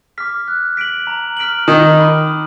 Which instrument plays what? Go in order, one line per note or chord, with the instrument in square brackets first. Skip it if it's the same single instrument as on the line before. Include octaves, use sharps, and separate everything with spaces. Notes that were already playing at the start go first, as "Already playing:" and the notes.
[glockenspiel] D6 F6 B6
F#6
B6 D7 F#7
A#5
F6 B6 D7 F#7
[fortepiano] D#3 [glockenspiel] G#5
[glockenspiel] B5 D6
D#6